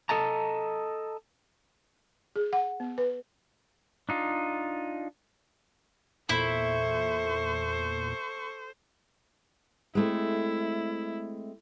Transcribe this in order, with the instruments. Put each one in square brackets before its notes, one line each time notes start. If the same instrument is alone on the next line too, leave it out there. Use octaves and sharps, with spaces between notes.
[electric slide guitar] A4 D#5 A5 A#5
[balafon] G#4
F#5
B3
B4
[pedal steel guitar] D4 D#4 F4
[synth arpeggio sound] E2 A#2 [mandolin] E4 [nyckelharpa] A4 C#6 [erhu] C5
[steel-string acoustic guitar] G#3 A3 C4 [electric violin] E4